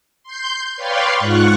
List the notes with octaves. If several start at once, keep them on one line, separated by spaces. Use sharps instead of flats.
C6 G6
B4 C#5 D5 F5 G5 C6
G#2 F4 F#5 C#6 F#6